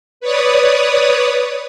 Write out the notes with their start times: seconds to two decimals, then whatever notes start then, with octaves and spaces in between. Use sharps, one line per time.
0.20 B4 C#5 D5 D#6